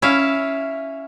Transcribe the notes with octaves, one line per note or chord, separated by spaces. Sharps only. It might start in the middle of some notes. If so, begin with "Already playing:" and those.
C#4 E4 E5 F5